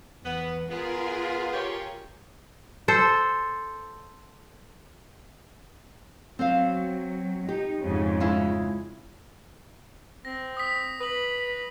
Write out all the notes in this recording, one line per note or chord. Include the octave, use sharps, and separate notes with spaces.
E2 B3
B3 F4 G#4 A#4
G4 C#5
A4 C5
F#3 C4 C5 F5
D#4 G4
F2 G#2 C#3
G#3 E4 F4
C4 A#6
D#6 B6
B4 D#6 F#7